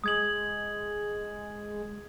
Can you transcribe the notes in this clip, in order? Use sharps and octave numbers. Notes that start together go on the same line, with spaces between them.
G#3 D#6 G#6 F#7